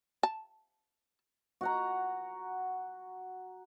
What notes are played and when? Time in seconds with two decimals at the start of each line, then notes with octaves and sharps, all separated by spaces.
0.23 A5
1.61 F#4 F#5 A#5